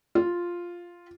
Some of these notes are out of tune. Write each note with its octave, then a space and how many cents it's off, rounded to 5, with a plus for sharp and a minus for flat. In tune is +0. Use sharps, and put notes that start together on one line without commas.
F4 +0